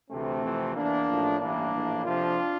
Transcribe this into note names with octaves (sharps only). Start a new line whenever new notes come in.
D2 C3 E3 A3 C4
F2 C3 E3
E2 E3 A#3 D4
A1 A2 F3
A1 G2 E3 A#3 D4
A#1 A2 E3
F2 C3 F3 D4 F4